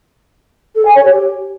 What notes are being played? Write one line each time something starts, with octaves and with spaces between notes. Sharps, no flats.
A4
G#5
C#5
G4